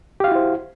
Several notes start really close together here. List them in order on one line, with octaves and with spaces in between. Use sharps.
G4 F5 F#4 E4 C5